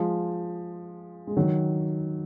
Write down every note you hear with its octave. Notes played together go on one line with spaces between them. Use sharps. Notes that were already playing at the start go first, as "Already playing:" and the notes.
Already playing: F3 G#3
G#3
D#3 F#3